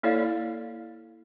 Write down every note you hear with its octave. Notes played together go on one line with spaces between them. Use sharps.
A#3 E4 A4 C#5 D5 F5